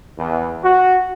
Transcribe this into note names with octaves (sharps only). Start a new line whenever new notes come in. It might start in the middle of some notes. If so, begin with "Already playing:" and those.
E2
F#4